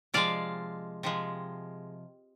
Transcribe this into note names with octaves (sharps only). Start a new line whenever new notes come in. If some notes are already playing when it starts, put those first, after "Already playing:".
C3 F3 G#3 D5 F5
C3 F3 G#3